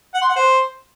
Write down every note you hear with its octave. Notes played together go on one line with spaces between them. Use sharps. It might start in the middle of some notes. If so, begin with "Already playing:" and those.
F#5
C6
F#5
C5